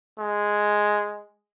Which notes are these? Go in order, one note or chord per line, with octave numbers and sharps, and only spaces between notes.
G#3